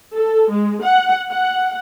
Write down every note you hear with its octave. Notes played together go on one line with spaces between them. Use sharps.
A4
G#3
F#5
F#5